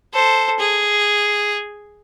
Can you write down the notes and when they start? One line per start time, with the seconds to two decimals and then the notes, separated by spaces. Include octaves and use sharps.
0.13 A4 C5
0.59 G#4